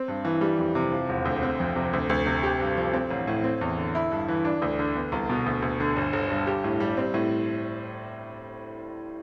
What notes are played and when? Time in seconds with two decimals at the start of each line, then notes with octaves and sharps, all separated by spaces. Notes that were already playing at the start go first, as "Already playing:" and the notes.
Already playing: C4
0.08 G2
0.25 E3
0.41 G3
0.59 F2
0.75 C3
0.92 F3
1.09 E1
1.25 D2
1.43 C4
1.60 F2
1.76 C3
1.93 D2
2.09 D2
2.26 C3
2.43 G4
2.60 G2
2.77 F3
2.93 C4
3.11 A1
3.27 A2
3.44 C4
3.61 E2
3.78 D3
3.95 E4
4.11 G2
4.28 E3
4.45 D4
4.62 D2
4.79 D3
4.95 B3
5.12 C2
5.29 B2
5.46 D2
5.62 D2
5.80 D3
5.96 G1
6.13 G1
6.30 G2
6.47 G4
6.64 A2
6.80 G3
6.97 C4
7.14 A2